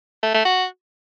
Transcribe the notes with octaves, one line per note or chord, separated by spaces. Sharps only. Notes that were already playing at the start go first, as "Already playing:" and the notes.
A3
A3
F#4